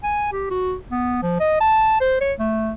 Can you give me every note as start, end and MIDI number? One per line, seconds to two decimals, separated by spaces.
0.03 0.33 80
0.33 0.47 67
0.50 0.75 66
0.92 1.20 59
1.22 1.40 53
1.40 1.60 75
1.61 1.99 81
2.01 2.17 72
2.21 2.33 73
2.39 2.73 57